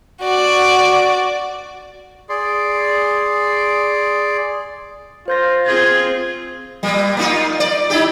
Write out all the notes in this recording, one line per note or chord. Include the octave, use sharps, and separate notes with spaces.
F#4 D5
G#4 D5 C6
F4 C5 G6 A#6
C4 F4 G#4 G#6
A#2 G3
A#3 D#4 F4
D5
D#4 E4 G4